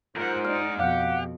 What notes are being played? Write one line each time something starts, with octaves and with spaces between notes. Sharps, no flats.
E2 G#2 F4 A#4 C5 F#5
D#4 D5 F6
F2 B2 G4 F5 F#5